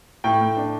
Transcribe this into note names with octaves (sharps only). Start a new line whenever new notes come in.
A2 G5
A2
D4